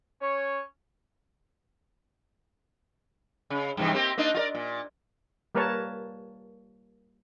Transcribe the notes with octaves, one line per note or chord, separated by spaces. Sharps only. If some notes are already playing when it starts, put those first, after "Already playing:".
C#4 C#5
C#3
G2 C3 E3
A#3 C4 G4
A#3 D4 D#4
F4 A#4 D5
A#2
G3 A#3 A#4 B4 C#5 A5